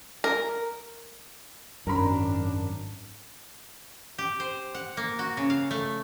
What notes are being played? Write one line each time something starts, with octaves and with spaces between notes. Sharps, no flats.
A#4
G#1 F#2 D4 A#4 A#5 B5
G4
C5
F#5
A#3
F#4
C#3
F5
A3